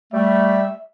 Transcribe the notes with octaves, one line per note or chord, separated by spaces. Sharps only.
G3 A3 E5